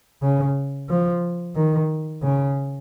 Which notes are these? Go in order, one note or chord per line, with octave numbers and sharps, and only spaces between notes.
C#3
F3
D#3
C#3